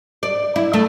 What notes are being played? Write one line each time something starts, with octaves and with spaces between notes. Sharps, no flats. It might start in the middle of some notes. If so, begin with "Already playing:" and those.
D5
E4
A3